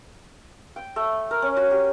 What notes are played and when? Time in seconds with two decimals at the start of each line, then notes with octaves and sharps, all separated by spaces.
0.76 G5
0.96 A3
1.31 A#4
1.42 C#4
1.57 F#4
1.71 G4